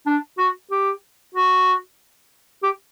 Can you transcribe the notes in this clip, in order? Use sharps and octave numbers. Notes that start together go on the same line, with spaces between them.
D4
F#4
G4
F#4
G4